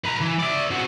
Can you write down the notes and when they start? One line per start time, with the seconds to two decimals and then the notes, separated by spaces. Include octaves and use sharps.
0.04 B4 A#5
0.21 E3
0.39 D5 E5
0.71 C4 F#4